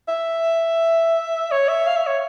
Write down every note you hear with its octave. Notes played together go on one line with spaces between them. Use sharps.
E5
C#5
E5
F5
E5
C#5